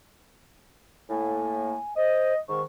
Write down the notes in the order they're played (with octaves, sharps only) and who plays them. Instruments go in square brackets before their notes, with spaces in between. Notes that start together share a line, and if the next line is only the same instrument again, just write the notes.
[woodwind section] A2 A#3 [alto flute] G#5
[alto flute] C5 [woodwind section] D#5
[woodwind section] G#2 D#3 [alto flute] C#6